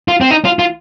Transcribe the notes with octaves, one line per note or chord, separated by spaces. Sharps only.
F4
C4
D#4
F4
F4